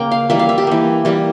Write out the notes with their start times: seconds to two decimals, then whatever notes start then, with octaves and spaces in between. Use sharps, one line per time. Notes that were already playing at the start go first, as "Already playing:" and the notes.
Already playing: C#3 A#3 G5
0.11 F5
0.30 E3 G3 A#3 E5
0.39 F5
0.49 E5
0.58 G4
0.67 E3 A#3
1.05 E3 G3 A#3